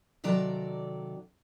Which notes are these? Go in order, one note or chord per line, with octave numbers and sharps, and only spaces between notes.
C3 D#3 F#3 A4 D5 A#5